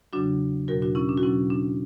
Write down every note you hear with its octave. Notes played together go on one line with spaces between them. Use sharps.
E2 C#3 F#3 D4 F#4
E2 B2 F#3 F#4 A#4
D4 F#4
C#4 E4
D4
F#4
E2 B2 F#3 C#4 E4
D4